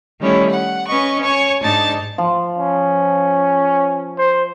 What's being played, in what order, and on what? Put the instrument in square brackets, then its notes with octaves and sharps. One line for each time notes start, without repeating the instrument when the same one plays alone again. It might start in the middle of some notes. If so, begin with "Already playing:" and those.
[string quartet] D#3 G3 A3 C#4 E4
F#5
C#4 B4 D#5 C#6
C#5 G#5 C#6
G#2 D4 D#4 A5 A6
[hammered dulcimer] F3
[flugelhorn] C#4
C5